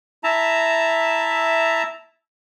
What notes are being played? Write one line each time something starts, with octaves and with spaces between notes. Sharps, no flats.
E4 E5 A5 A#5